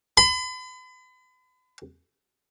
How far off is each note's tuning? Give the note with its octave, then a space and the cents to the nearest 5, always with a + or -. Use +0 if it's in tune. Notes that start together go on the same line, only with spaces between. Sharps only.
B5 +40